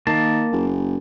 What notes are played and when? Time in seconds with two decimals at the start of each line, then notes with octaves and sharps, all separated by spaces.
0.07 D#3 A#3 A5
0.52 F#1